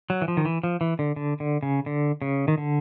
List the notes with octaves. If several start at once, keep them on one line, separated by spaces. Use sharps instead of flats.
F#3
E3
F3
D#3
E3
F3
E3
D3
D3
D3
C#3
D3
C#3
D#3
D3